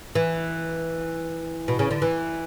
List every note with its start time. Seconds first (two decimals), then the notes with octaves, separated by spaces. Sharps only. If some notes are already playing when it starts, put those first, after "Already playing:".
0.15 E3
1.68 B2
1.79 C#3
1.91 D3
2.02 E3